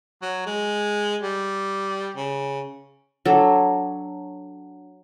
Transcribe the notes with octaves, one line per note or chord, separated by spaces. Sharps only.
F#3
G#3
G3
C#3
F#3 D4 A4